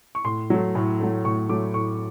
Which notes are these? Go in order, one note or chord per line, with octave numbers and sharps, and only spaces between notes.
C#6
A2 C6
F#3 A3
A2
F#3 A3
A2 C#6
F#3 A3 D6
A2 C#6